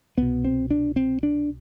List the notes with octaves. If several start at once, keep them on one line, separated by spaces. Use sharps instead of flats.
C2 B2 B3
C4
D4
C4
D4